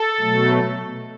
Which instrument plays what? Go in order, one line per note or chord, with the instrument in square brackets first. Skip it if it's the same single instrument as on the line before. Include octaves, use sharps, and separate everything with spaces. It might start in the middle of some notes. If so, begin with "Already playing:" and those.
Already playing: [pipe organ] A4
B2 F#3 A3